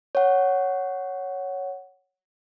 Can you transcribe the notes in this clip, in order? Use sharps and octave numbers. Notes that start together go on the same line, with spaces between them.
C#5 F#5